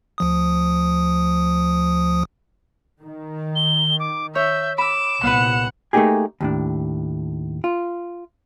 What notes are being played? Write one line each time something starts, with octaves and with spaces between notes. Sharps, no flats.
D2 F3 D#6
D#3
G7
D6
C#5 E5 G6
B5 D6 E6 E7
C2 A#2 B3 B4 F#5
A3 A#3 C4 D#4 G4 G#4
D#2 A2 D4
F4